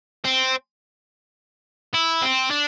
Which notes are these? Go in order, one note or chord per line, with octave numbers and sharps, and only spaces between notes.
C4
E4
C4
D4